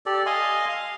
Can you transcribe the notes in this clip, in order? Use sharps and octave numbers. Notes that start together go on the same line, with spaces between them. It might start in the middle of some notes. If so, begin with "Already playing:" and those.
G4 A4 D5
D#5 F5 G#5 C6
F5